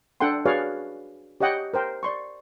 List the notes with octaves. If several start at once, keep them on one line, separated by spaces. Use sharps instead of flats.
D4 A4 F#5 G5 C6
F#4 G#4 B4 C#5 D5 F5
G4 C#5 D#5 F#5 G5
A#4 C5 G5
D5 C6 C#6